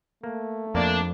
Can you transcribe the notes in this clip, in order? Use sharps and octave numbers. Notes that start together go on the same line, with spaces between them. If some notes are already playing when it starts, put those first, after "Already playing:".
A3 A#3
F2 A#3 D4